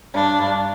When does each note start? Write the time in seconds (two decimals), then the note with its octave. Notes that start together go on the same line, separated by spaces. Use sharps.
0.14 G2 D4
0.40 G2